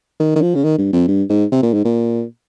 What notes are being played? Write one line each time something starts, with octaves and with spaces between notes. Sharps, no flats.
D#3
D#3
F3
C#3
D#3
G2
F2
G2
G#2
C3
A#2
G#2
A#2